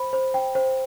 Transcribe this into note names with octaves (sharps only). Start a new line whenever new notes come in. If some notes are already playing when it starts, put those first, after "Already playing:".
Already playing: C5 B5
C5
G5
C5